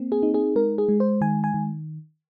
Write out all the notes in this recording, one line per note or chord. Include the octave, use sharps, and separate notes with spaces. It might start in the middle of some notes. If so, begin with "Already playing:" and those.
Already playing: A#3 C4
G#4
D#4
G#4
G#3 A#4
G#4
G#3
C5
D#3 G#5
G#5
D#3